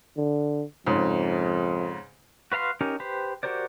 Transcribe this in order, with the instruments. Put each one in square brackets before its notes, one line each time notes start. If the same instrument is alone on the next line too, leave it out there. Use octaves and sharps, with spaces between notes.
[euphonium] D3
[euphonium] F2 [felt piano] G#2 C#3
[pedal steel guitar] F#4 B4 F5 A#5 C6
C#4 D#4 G4 A#4
G4 B4 C5
F#4 G4 A#4 C5 D5